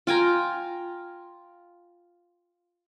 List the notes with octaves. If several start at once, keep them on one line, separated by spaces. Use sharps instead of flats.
F4 G5 G#5 A#5